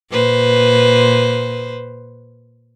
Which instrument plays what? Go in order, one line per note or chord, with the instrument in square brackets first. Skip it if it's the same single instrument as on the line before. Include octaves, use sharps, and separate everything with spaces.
[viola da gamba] A#2 B4 C5